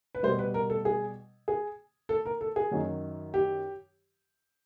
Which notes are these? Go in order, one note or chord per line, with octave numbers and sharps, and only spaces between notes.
B4
B2 G3 C5
B4
A#4
A4
G#4
G#4
A4
A#4
A4
G#4
F#2 D#3 F#3
G4